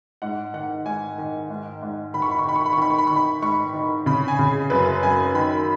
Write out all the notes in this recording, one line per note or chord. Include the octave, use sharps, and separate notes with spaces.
G#2 F#5
D#3 F#5
G#2 G#5
D#3
G#2
G#2
D#3 B5
C#6
B5
C#6
D#3 B5
C#6
B5
C#6
D#3 B5
C#6
B5
C#6
D#3
B5
G#2 C#6
D#3
C#3 B5
G#5
C#3
G#4
F#2 B4
F#2 G#5
D#3 B5